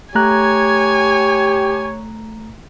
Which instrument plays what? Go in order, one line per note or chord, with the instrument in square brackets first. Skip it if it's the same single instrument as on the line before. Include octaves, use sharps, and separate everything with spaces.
[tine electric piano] A3 A#5 F#6 [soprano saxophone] G4 [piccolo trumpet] C#5 [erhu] G#5